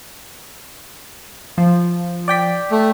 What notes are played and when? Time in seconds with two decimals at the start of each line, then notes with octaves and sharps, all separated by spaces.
1.58 F3
2.28 D5 G5 B6
2.71 A3